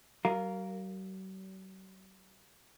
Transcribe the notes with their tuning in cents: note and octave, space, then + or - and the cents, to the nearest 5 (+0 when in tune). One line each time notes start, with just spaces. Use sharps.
F#3 +45 A#4 -5 F5 +0